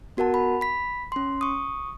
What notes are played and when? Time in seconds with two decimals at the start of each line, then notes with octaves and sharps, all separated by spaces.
0.17 B3 F#4 A#4 F#5 A5
0.34 B5
0.61 B5 B6
1.12 C#4 C6
1.41 C#6 D#6